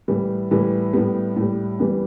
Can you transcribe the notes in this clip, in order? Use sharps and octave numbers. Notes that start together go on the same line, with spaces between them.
A2 E3 G3
A2 E3 G3
A2 G3 B3
A2 G3
E2 E3 G3